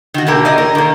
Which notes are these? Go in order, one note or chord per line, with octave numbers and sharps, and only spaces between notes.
D#3 F#4
B2 D3 A#3 G4 A#4
A2 D5 D#5
A#4
D#3 A#3